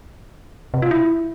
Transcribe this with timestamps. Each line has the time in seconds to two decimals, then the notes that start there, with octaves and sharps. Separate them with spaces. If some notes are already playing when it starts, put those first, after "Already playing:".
0.74 C3
0.82 F4
0.91 E4